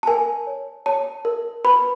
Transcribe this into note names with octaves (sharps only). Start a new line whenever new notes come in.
A5
A#4 G#5
C#5
C#5 A5
A#4
B4 B5